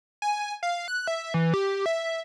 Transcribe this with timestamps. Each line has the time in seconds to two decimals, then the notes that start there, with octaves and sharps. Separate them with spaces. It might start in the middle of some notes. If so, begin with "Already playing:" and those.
0.22 G#5
0.63 F5
0.88 F#6
1.07 E5
1.34 E3
1.54 G4
1.86 E5